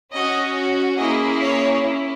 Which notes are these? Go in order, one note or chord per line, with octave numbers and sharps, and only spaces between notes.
C#4 F#4 D#5
A#3 C#4 E4 G#4 D#5
C#5
C#4 E4